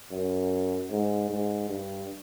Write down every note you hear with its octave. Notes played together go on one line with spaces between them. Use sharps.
F#2
G#2
G#2
G2